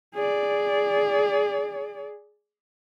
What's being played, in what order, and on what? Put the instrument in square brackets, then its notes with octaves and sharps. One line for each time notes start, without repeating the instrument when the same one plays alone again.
[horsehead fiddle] G#4 D5